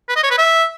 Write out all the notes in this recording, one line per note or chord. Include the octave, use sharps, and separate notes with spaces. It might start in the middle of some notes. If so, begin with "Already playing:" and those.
B4
D#5
C#5
B4
E5